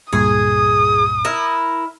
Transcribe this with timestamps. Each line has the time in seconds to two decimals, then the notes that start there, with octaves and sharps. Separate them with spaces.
0.13 C#2 G2 A#2 G#4 D#6
1.25 E4 A#4